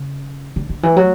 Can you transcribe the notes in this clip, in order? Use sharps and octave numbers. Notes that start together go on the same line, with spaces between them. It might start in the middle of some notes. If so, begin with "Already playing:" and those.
Already playing: C#3
D3
D3
E3
F#3